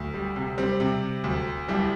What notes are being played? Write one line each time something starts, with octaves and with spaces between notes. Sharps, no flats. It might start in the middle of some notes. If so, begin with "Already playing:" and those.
Already playing: D2
G3
C3
G3 C4
C3
D2
C2 G3